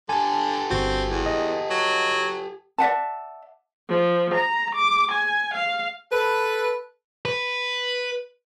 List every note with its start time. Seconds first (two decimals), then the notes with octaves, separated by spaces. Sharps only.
0.09 D3 G4 A4 G#5
0.70 G1 C4 F#4
1.10 E2
1.26 D#5
1.71 F#3
2.78 D5 E5 F#5 A5
3.89 F3
4.34 A#5
4.75 D6
5.11 G#5
5.54 F5
6.11 A4 B4
7.25 B4